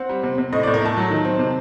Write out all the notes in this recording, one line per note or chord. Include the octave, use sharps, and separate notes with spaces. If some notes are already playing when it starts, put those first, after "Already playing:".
Already playing: C4 F#5
G3
C3
C3
A2 D#5
D5
A2
A#4
A3 A5
F#3
D#3
C4
C3